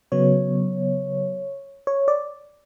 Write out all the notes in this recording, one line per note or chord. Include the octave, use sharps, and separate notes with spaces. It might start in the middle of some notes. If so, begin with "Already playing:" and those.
C#3 F#3 B3 C#5
C#5
D5